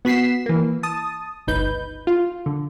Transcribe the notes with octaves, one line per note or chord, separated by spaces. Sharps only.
B3 F#4 B6 C7 E7
E3 A#3
A5 D#6
G1 C#2 D#4 B4 G6
F4
D3